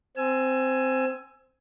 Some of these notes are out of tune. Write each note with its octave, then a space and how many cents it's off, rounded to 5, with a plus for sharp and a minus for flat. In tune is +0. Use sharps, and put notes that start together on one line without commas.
C4 -5 G#5 +10 E6 +25